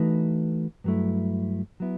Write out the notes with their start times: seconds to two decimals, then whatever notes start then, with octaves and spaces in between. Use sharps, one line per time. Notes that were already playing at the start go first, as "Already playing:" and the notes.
Already playing: E3 A3 D#4 F#4 B4
0.84 G2 F#3 A3 E4
1.80 F#3 B3 E4